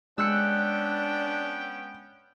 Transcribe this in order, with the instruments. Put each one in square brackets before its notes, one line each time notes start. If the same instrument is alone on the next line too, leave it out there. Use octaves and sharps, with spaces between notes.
[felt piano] G#3 [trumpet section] B3 C#4 G5 [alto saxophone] D4 [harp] E6 F#6 C#7